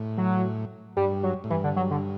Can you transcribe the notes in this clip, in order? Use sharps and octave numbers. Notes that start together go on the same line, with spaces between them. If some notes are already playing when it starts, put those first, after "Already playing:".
Already playing: A2
F#3
G2 G3
F#3
A2
G2 E3
D3
F#3
D3